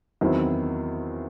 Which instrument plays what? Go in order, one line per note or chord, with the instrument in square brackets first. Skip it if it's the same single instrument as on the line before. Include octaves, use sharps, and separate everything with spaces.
[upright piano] E2 D#3 F#3 C4 E4